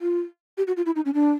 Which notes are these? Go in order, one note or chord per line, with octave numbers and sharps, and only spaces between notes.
F4
G4
F#4
F4
E4
D#4
C#4
D4